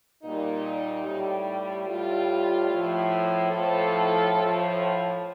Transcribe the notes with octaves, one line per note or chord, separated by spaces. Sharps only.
A#2 G3 D#4
A2 G3
A2 G3 F4
A2 F3
A2 F3 A4
A2 F3